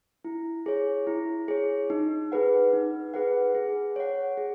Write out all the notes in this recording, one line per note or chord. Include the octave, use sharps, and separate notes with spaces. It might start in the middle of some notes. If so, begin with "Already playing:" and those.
E4
G#4 C#5
E4
G#4 C#5
D#4
G#4 B4 F#5
D#4
G#4 B4 F#5
G#4
C#5 F#5
G#4